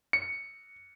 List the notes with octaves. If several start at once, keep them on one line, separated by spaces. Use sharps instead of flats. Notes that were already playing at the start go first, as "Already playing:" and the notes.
C#7